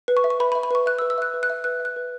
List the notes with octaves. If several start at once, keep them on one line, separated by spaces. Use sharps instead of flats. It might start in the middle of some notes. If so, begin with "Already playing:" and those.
B4
C#6
E5
C#6
B4 B5
B5
E5
B5
B4 C#6
E5 F#6
E6
B4
E6
E5 F#6
B4
F#6
E5
B4 F#6
E5
F#6
B4